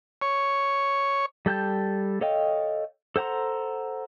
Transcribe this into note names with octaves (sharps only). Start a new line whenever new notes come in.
C#5
G3 A4 G5 A5 G6
A4 C#5 D#5 F5 G5
A4 C5 F#5 A#5 C6